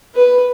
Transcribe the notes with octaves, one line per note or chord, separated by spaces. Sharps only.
B4